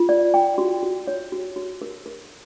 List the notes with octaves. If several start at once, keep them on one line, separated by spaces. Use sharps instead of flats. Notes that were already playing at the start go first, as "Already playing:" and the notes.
Already playing: F4
D5
G5
F#4
F#4
C#5
F#4
F#4
A#4
A#4